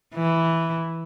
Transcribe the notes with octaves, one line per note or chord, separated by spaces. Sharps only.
E3